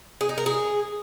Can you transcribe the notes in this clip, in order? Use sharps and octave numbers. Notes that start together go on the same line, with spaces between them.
G#4
D#4
A#4
G#4